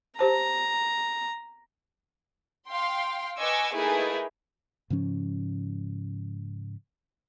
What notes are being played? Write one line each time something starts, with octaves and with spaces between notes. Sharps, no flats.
G4 C5 A5 A#5
F5 G5 C6
B4 D#5 G#5 C#6 D6 E6
A3 A#3 D#4 E4 G#4 B4
G#2 C#3 F3 C#4